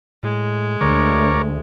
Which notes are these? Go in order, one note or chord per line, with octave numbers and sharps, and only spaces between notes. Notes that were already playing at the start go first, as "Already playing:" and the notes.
A2 G#3
D2 D3 A#4 C#5 D5